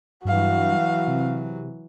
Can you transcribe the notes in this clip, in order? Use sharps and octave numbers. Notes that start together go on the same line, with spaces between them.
G2 E3 F#3 F#4 F5
C3